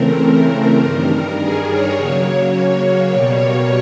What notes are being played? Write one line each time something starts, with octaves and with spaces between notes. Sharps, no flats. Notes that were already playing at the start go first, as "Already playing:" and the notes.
Already playing: C#3 E3 A3 C4 A#4
G2 D#3 G3 A#4
G#4
C#5
C#3 F#3 A#3
B2 G3 A#3 C#5
C#5